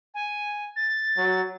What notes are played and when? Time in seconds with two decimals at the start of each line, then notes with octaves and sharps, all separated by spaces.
0.14 G#5
0.76 A6
1.18 F#3